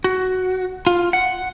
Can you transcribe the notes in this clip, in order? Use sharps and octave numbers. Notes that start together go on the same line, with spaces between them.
F#4
F4
F#5